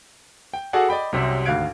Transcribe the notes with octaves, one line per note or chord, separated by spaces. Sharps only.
G5
F#4 G#4 A4 D5 F#5 G#5
D5 D#5 G5 B5
C2 F#2 C3 G4 C#5 E5
G#1 D2 F5 F#6 G#6 D7